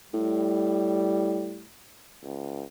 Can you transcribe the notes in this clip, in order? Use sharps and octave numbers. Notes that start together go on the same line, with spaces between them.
A2 G3
C#2